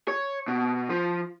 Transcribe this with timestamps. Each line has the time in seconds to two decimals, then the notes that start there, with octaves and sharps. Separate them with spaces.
0.08 C#5
0.48 B2
0.89 F3